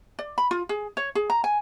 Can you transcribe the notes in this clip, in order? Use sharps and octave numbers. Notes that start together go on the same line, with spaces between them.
D5
B5
F4
G#4
C#5
G#4
A#5
G#5